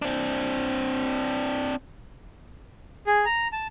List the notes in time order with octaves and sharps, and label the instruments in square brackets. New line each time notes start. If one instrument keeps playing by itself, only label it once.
[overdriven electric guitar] C4 D4
[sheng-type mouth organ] G#4
A#5
A5